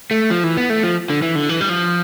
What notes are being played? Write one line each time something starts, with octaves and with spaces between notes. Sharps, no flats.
A3
F3
E3
B3
A3
F3
D3
E3
D3
E3
G3
F3